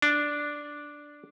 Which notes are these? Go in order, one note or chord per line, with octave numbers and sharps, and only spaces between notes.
D4